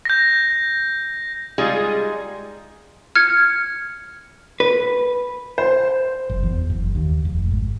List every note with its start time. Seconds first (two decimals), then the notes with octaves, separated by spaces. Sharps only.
0.05 G6 A#6
1.58 G3 G#3 D#4 F4 G#4
3.15 F6 G#6 C#7
4.60 B4
5.58 C5
6.29 F#1
6.43 E2
6.70 F#1
6.95 D#2
7.25 F1
7.51 G#1